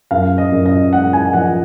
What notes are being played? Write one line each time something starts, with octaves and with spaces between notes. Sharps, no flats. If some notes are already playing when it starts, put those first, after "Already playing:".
F#2 F5
D#5
F#2
D#5
G#3 F#5
G#5
F3 F#5